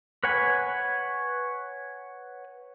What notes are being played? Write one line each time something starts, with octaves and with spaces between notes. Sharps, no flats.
B4 C#5 F#5 G#5 B5